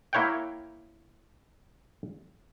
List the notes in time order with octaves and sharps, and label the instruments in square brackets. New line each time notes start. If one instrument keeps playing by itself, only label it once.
[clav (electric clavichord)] A#3 E4 C#5 F#5 G5